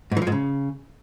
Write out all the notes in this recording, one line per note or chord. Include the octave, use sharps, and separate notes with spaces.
G#2
E3
F3
G#2
C#3